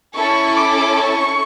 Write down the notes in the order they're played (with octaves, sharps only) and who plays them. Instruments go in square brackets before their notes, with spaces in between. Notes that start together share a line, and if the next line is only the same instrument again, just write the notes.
[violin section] C#4 E4 A4 [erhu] C#6
[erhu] D6
C#6